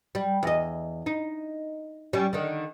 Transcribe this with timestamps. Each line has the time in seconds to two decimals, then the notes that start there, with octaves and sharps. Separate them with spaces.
0.15 G3
0.43 E2 D#5
1.06 D#4
2.13 G3 C#4
2.33 D3 D#3